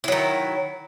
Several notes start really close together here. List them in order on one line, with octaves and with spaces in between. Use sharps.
E4 F#3 D#3